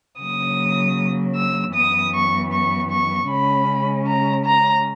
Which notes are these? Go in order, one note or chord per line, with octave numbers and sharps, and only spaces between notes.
C#3 F#3 A#3 D#6
E6
F#2 E3 B3 D#6
C#6
C#6
C#6
C#3 G#3 C#4 B5
A#5
A#5